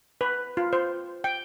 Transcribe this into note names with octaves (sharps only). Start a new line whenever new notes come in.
B4
F4
C5
G5